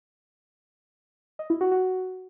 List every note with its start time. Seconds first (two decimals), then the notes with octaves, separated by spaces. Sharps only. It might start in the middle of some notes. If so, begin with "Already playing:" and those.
1.39 D#5
1.50 E4
1.61 F#4
1.72 F#4